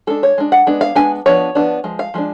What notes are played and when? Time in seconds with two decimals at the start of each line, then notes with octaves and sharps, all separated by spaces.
0.07 G#3 D4 A4
0.23 C#5
0.38 G#3 D4
0.52 F#5
0.67 G#3 B3 D4
0.81 F5
0.95 G#3 B3 D4 G#5
1.26 F3 B3 D4 C#5
1.55 F3 B3 D4
1.84 F3 G#3
1.99 F5
2.14 F3 G#3 D4